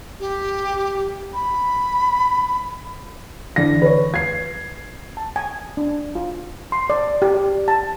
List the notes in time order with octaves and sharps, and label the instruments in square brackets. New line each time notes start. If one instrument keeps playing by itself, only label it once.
[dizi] G4
B5
[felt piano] D3 E3 D5 A#6
B4 C#5
G#6 C7
[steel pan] A5
G#5
D4
F4
C6
D5
G4
D5
A5